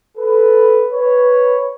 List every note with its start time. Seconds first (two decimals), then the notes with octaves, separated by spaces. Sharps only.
0.17 A4 B4
0.93 B4 C#5